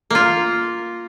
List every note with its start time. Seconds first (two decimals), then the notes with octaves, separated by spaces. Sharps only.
0.10 A#3 F4